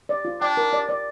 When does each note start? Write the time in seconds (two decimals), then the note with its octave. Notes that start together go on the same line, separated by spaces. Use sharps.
0.09 D5
0.25 F4
0.41 D4 G5
0.57 A#4
0.73 D5
0.89 D5